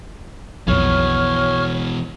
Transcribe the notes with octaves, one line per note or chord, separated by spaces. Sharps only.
B1 F2 B2 E3 C#5 C#6 F6